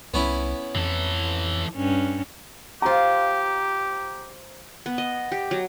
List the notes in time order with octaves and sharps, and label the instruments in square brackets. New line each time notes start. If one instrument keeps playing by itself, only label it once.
[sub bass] C2 [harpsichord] B3 C#4 E4
[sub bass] F2 [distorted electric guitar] E3 A4
[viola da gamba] G2 C#4
[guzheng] F4 D#5 [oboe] G4 [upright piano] C5 A#5
[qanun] B3
D#5
G4
F#3